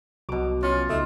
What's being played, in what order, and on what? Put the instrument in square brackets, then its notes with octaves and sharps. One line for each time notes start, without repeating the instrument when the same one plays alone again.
[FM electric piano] C2 F#3 [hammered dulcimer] B2 D6
[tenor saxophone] C#4 [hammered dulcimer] F4
[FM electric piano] C#2 D#4 [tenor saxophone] A3 [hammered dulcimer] D#5